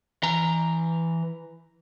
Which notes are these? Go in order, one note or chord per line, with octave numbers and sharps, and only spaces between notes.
E3 A#5